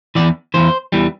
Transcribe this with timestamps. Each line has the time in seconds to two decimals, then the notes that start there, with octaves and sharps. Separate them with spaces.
0.15 E2 C3 E3 D5
0.54 E2 C3 E3 C5
0.92 E2 E3 G3